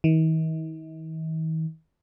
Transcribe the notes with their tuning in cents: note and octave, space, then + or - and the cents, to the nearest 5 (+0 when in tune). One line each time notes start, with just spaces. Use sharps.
D#3 +45